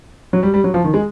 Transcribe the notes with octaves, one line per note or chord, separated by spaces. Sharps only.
F#3
G3
G3
F#3
F3
D#3
G#3